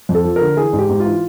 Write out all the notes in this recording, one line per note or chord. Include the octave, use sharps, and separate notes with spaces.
F2
A4
F3
D3 A#4
E3 G#4
G#2
G4
G#2
F4
E3